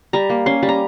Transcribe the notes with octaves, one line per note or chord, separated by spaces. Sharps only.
G3 A#5
A#3
C#4 C6
G3
A#5